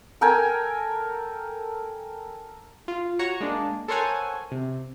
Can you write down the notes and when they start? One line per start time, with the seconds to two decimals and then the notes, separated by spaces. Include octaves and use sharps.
0.21 A4 A#4 G5 G#5
2.88 F4
3.19 F#4 C#5 A#5 C#6
3.41 G#3 A#3 D4
3.88 A4 A#4 C5 C#5 F#5 G#5
4.51 C3